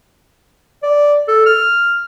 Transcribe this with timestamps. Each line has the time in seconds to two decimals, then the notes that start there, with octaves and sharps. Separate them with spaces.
0.83 D5
1.28 A4
1.46 F6